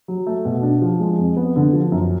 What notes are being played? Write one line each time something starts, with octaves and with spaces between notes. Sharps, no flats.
F#3
A3
B2
D4
F3
G#3
F2
B3
D3
F3
F#2